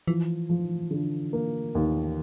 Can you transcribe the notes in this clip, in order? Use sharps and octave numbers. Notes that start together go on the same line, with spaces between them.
E3 F3
F3
D3
A#3
D#2